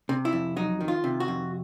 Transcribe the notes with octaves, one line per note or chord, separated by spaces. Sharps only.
C3
E4
F2
F#3 D#4
D#3
F4
C3
F#4
F2